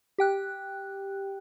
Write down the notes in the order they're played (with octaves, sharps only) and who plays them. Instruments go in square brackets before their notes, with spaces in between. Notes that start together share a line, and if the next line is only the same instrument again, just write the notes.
[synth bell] G4 G5 F#6